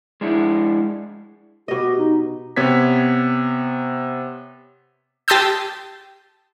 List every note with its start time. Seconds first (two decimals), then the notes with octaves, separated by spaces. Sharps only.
0.21 G#3 D4 E4
1.68 B2 G4 D#5
1.98 D#4
2.56 C3 B3 C#5 G#6 B6
5.28 G4 A5 C6 D#6 E6 G6